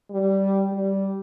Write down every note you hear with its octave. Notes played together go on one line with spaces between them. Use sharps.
G3
G3